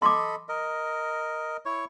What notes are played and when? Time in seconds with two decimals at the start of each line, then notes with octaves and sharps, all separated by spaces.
0.02 A4 D#5 B5 C6 D6
0.49 A#4 D#5
1.66 E4 C#5 C#6